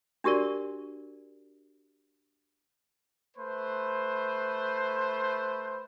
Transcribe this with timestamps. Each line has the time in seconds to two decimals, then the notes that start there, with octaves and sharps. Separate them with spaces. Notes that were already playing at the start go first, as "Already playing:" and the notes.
0.24 D4 F#4 G4 A#4 D5
3.37 A3 B4 C5